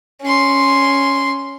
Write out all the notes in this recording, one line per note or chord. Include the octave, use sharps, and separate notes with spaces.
C#4 C6